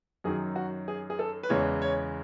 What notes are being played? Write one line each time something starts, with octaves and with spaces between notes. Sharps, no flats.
F#2 D#3 F#3 G#4
F#4
G#4
G#4
A4
B4
E2 C#3 E3 G#3 C#5
C#5